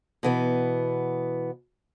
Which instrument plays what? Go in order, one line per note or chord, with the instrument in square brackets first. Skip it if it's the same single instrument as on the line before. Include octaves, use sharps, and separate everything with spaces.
[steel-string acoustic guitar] B2 E3 B3